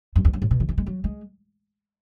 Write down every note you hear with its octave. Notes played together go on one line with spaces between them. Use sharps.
F#2
E2
F#2
A2
B2
D#3
E3
G#3
F#3
G#3